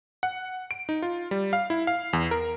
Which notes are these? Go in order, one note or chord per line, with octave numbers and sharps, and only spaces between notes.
F#5
D7
D#4
F4
G3
F5
E4
F5
E2
A#4